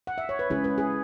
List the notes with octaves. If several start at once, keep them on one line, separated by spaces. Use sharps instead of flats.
F#5
E5
C#5
B4
C#3 G#3 C#4 E4 G#4
B4
G#4